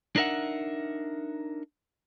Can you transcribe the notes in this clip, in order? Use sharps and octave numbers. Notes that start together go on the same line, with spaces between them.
D4 D#4 A#4 E5 F#5